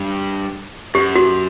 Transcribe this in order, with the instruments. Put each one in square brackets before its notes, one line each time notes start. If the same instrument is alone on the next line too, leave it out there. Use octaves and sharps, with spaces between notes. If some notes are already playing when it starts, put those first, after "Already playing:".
Already playing: [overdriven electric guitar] G2
[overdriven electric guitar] F#2 [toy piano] G4
[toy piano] F#4